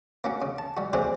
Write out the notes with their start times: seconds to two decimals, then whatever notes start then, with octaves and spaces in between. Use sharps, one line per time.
0.24 A#3 C#4 F#4
0.42 C#3
0.58 A5
0.77 G3 F#4
0.93 F#3 A3 C4 G#4 C5 D5